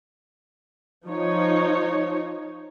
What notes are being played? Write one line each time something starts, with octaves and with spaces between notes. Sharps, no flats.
F3 D#4 C#5